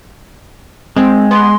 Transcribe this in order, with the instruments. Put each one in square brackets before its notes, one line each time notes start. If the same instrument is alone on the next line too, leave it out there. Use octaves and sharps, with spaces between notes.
[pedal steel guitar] G#3 [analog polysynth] C4
[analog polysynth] B3 [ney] C6